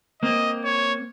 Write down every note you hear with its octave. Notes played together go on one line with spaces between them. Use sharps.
A#3 C4 D#5
C#5